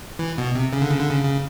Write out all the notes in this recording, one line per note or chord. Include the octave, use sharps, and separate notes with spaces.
E3
B2
C3
C#3
D3
C#3
D3
C#3
C#3